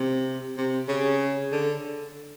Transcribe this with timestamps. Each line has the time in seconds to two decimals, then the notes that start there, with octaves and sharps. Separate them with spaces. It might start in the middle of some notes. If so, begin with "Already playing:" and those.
Already playing: C3
0.57 C3
0.88 C#3
1.52 D3